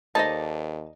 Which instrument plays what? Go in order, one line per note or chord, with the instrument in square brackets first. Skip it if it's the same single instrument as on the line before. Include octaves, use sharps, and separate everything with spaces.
[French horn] D#2 [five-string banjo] D#4 D5 [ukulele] A4 C5 D#5 [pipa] A5